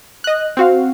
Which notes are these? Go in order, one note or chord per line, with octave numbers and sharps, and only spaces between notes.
D#5 F#6
C4 F#4 F5